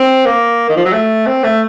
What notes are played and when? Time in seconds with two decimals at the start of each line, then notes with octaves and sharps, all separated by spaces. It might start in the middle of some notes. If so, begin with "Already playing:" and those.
Already playing: C4
0.26 A#3
0.69 D#3
0.77 F3
0.85 F#3
0.93 A3
1.26 C4
1.43 A3